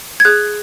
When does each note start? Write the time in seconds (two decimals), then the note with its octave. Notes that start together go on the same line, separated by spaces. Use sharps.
0.20 G#6
0.25 G#4 F#6